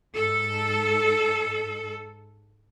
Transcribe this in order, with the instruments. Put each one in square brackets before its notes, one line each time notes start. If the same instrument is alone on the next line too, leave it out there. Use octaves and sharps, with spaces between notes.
[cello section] G#2 A4